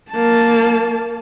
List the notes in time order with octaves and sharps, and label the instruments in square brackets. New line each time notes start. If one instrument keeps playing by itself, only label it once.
[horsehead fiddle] A#3 A5